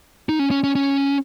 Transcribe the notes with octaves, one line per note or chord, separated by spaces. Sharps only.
D#4
C#4
C#4
C#4
C#4